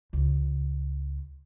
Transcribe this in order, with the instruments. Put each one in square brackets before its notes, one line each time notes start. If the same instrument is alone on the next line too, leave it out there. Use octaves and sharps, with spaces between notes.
[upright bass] C#2